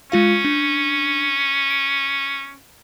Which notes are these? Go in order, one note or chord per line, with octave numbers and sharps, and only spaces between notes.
G#3 C#4 F4 F5
D4
D7